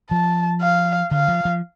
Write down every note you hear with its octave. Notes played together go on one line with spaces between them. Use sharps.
F3 A5
F5
D3 F5
F3
F3